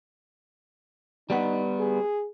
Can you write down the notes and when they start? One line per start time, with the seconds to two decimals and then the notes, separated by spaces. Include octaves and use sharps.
1.30 G3 B3 D#4 F#5
1.79 G#4